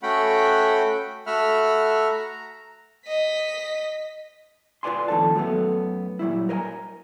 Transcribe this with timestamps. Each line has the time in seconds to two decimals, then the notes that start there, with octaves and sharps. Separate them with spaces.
0.03 A3 C#4 F#4 F#5 G5 B5
1.27 A3 F#4 E5 F#5 B5 F6
2.09 A#5
3.08 D#5 B6
4.83 F4 B4 D5 G#5 C6
5.08 F2 A2 D#3 A4 A5
5.35 F#2 F#3 G3 A3 B3
6.19 A#2 F#3 G3 E4
6.49 A#4 B4 D#5 G#5 A#5